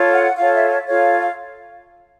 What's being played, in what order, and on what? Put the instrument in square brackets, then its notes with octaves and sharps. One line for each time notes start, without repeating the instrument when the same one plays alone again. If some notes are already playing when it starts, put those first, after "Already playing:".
Already playing: [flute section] F4 A4 C#5
F#5
F4 A4 C#5 F5
E5
E5
F4 A4 C#5 F5